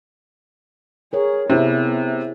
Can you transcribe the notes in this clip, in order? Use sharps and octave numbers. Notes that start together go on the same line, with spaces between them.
G#4 A#4 C#5
C3 B3 C4 E4 G#4